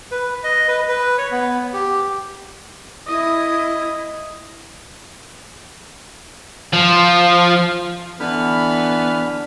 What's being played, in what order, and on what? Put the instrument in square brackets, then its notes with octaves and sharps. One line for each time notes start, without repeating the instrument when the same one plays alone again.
[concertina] B4
D#5
B4
B4
C#5
B3
G4
[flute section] E4 [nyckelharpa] D#5
[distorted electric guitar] F3
[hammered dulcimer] D3 [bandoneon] E3 B5 F6 [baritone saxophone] B3